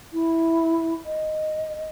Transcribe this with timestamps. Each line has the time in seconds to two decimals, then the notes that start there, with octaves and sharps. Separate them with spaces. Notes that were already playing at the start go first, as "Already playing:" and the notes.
0.13 E4
1.06 D#5